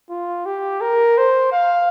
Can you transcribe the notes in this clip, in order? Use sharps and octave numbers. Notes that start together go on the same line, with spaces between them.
F4
G4
A#4
C5
F5